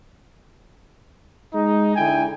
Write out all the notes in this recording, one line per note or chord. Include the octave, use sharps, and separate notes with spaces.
G#3 D#4
D3 E4 G5 G#5